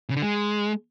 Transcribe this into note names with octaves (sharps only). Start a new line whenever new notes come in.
C#3
D3
G#3